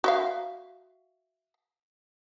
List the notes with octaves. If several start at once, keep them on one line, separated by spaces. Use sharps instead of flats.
F#4 E5 F5